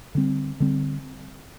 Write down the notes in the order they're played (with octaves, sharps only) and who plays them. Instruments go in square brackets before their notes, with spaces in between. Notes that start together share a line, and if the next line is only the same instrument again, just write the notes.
[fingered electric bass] D3 G3 C4
D3 G3 C4